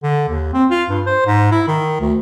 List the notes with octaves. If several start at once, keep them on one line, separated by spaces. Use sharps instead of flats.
D3
D#2
C4
F4
G2
C5
G#2
E4
D#3
D2